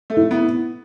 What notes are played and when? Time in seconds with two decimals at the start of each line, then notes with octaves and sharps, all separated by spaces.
0.10 A3
0.17 E4
0.31 B3